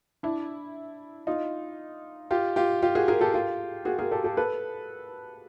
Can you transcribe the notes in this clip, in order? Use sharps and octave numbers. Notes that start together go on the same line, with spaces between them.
D4 E4
D#4 F4
F4 G4
F4 G4
F4 G4
F#4 G#4
G#4 A#4
G4 A4
F4 G4
F#4 G#4
G#4 A#4
G4 A4
G4 A4
A4 B4